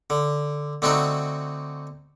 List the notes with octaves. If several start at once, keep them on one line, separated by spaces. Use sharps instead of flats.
D3
D3 A3 C4 D#4 F#4